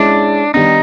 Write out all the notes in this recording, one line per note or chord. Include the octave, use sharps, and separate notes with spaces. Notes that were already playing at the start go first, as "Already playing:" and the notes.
Already playing: G#3 C#4 D4 E4
D#3 G3 B3 D4 D#4